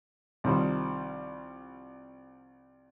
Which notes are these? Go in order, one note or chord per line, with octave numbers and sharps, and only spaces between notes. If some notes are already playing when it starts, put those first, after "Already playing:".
C2 D#3 F3 G3